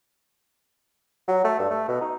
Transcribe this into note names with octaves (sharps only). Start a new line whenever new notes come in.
F#3
A3
G2
A3
B2
D#4